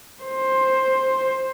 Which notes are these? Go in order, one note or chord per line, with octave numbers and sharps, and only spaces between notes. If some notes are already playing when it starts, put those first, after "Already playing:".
C5